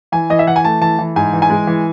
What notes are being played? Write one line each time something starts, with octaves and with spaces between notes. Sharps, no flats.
E3 G#5
E3 D#5
E5
E3 F#5
G#5
A3 A5
E3 A5
E3
G#2 G#5
E3
G#5
G#3
E3